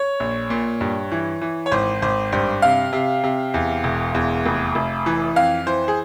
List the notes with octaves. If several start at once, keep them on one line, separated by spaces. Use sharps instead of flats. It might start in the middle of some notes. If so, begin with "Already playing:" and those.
Already playing: C#5
A#1
A#2
G2
E3
E3
C#5
G#1 C5
G#1 C5
G2 C5
C3 F5
C3
C3
E2
E1
E2
F1
F1
E3
F2 F5
E3 C5
G#4